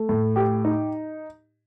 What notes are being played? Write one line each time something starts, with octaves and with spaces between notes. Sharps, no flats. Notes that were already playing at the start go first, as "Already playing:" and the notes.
Already playing: A3
A2
G4
D#4